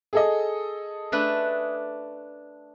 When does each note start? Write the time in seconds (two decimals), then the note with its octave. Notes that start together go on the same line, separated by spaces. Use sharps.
0.13 G#4 A4 D#5
1.12 A3 D4 B4